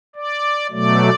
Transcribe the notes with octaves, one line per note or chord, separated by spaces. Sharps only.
D5
B2 F#3 A3 D5